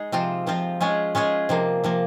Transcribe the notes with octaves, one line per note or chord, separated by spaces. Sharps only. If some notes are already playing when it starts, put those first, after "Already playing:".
Already playing: G#3 D#4 G#4
C3 F3 C4 F4
C3 F3 C4 F4
G#3 C#4 F4 G#4
G#3 C#4 F4 G#4
C3 F3 A#3
C3 F3 A#3